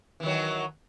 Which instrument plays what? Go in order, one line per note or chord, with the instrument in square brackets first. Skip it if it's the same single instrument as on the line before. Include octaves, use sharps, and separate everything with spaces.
[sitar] E3
D#3
F#3